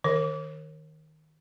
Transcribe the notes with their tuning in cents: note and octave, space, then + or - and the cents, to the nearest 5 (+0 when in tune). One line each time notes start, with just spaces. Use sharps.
D#3 +0 A#4 +0